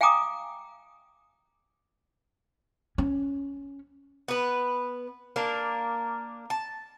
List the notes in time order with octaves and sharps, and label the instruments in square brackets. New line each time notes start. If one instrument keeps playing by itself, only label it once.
[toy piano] F5 G5 G#5 A#5 D6 D#6
[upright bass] C#4
[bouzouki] B3 B4
A#3 D4 A#4
A5